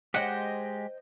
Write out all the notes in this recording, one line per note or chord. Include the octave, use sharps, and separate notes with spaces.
G#3 G4 C5 D#5 F#5 G5